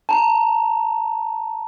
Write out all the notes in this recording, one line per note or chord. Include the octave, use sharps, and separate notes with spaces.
A5 A#5